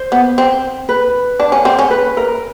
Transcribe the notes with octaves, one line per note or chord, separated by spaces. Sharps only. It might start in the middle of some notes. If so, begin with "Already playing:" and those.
Already playing: C5
B3
C4
B4
D4
C#4
C4
C#4
B4
A#4